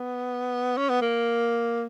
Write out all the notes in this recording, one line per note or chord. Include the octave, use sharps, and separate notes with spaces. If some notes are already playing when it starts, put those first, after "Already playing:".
Already playing: B3
C#4
B3
A#3